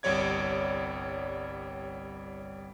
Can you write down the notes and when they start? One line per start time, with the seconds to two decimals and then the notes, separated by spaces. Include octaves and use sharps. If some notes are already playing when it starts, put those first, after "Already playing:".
0.03 G1 C2 G3 C#5 D5 G#6